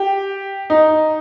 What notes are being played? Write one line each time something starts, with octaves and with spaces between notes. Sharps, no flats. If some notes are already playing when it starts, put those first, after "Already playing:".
Already playing: G4
D#4